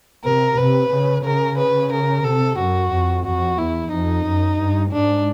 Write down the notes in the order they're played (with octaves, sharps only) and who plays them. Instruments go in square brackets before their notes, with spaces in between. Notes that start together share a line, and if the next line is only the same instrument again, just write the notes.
[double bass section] C3 [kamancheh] A#4
[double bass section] C3 [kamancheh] B4
[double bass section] C#3
[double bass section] C#3 [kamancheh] A#4
[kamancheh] B4
A#4
[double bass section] C3 [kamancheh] A4
[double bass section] F#2 [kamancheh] F#4
[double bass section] F2
[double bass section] F2 [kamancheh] F#4
[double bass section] E2 [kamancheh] E4
[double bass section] F2 [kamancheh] D#4
[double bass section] F#2
G2
[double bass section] G#2 [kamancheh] D4